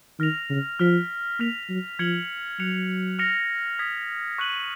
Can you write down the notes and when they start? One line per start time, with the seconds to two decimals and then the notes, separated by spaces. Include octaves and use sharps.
0.19 D#3 F6 A#6 F7
0.50 C#3
0.79 F3 F6 B6 F7
1.39 A#3 F6 B6 F7
1.69 F#3
1.99 F3 F6 G#6 C#7 F#7
2.59 F#3 F#6 C#7 F7
3.19 F6 A#6 C#7 F7
3.79 D#6 G#6 B6
4.38 C#6 F#6 A#6 D#7 F#7